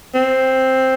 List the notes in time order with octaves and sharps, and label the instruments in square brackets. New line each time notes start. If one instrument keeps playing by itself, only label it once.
[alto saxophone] C4